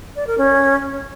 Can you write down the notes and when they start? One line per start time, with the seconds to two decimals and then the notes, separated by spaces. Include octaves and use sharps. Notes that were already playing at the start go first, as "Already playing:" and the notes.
0.16 D5
0.27 A#4
0.38 C#4